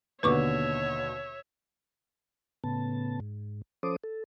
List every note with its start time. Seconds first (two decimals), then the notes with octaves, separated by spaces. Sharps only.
0.23 D#2 B2 D3 B4 C#5 E5 C#6 D6
2.64 A2 C#3 B3 A5
3.20 G#2
3.83 F3 C#4 A4 C5 D6 D#6
4.04 A4